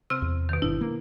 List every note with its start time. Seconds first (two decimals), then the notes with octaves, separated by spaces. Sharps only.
0.10 C3 C4 F6
0.22 E2
0.49 B2 D#3
0.62 G1 D4 E4
0.81 A#3